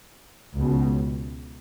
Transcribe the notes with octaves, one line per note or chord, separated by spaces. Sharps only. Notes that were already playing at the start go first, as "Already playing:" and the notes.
C#2 B2